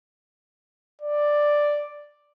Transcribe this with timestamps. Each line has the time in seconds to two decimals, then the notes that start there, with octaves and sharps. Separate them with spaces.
1.02 D5